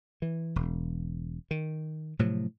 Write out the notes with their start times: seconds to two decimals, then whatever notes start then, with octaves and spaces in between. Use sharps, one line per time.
0.22 E3
0.56 E1
1.51 D#3
2.19 A2 C3 F3 F#3